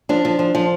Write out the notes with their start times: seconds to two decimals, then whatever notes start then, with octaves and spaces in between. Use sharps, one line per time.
0.09 F3 D4
0.25 F3
0.39 F3
0.55 F3